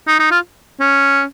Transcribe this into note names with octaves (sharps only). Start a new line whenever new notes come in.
D#4
D#4
F4
C#4